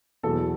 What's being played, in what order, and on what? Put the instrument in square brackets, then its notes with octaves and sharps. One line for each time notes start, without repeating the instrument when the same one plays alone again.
[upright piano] E2 B2 F#3 A4